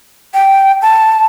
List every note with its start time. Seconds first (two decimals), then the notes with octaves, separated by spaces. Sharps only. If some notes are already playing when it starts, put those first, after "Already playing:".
0.34 G5
0.82 A5